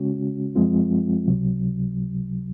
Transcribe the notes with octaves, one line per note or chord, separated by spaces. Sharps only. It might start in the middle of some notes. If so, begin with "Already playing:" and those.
Already playing: C#3 G#3 C#4 F#4
F#2 F3 G#3 C4 F4
C#2 C3 F#3